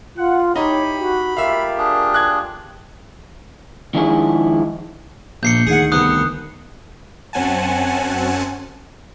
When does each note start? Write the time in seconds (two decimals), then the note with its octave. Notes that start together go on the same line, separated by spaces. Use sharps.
0.16 F4 F#5
0.56 D#4 E4 G4 C#5 B5
0.99 F#4
1.37 A3 F4 G4 A#4 E5 F5
1.78 D4 G#4
2.14 F#6 G#6
3.94 D#3 F3 G#3 D4 E4 G#4
5.43 A#1 G6 C7 C#7
5.67 D2 D#3 G#4 F#5
5.92 C2 B3 D#6 F#6
7.33 F#2 C4 C#4 F#5 G#5 A5